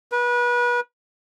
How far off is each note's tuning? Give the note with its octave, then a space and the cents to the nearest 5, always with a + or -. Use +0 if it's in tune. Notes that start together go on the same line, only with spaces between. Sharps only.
B4 -30